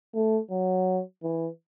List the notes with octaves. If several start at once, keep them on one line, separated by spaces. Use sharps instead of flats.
A3
F#3
E3